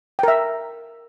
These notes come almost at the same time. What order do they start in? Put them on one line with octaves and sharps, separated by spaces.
G5 A#4 E5